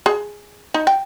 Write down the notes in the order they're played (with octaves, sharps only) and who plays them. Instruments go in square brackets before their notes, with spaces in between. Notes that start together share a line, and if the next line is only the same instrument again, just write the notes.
[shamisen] G#4
D#4
G5